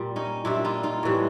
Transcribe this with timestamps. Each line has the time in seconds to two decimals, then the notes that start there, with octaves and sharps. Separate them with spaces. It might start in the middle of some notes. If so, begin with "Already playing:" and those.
Already playing: A#2 G3
0.16 C#4 D#4
0.45 A#2 G3 D4 E4
0.65 D#4 F4
0.83 D#4 F4
1.03 A2 E3 G3